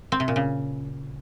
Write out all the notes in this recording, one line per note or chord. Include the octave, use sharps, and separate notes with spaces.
C4
C3
A#2
C#3